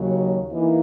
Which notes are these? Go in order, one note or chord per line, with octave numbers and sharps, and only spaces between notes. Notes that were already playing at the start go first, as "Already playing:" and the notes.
Already playing: D#2 C#3 F#3
E3 A#3 D#4